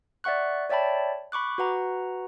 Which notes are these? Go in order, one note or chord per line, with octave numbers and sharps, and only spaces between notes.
D5 E5 F#5 C#6 F#6
C#5 D5 E5 G5 A5 B5
B5 C#6 D6 F#6
F#4 B4 F#5 A#5